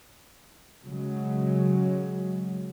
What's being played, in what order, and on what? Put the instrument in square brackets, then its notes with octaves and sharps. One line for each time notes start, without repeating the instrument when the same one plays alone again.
[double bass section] C#3 F#3 G#3